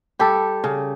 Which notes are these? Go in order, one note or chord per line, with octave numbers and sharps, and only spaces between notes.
G3 G4 A4
C#3